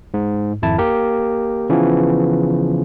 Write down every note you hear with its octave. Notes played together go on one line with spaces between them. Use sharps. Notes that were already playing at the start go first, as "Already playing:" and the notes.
G#2
G#1 F2 E4 A5
A#3 G4 A#4
C#3 E3 F3 B3